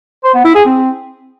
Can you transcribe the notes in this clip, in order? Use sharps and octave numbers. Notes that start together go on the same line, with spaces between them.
C5
B3
E4
G#4
C4